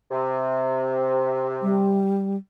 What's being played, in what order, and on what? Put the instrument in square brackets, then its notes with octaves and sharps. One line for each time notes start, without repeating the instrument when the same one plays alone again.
[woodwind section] C3
[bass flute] G3